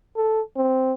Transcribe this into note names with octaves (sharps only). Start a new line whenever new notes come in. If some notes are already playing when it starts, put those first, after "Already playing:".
A4
C4